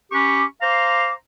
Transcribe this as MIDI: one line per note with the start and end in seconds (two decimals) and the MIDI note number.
0.12 0.43 61
0.12 0.43 67
0.12 0.43 83
0.12 0.43 85
0.12 0.43 86
0.62 1.12 72
0.62 1.12 77
0.62 1.12 82
0.62 1.12 84
0.62 1.12 86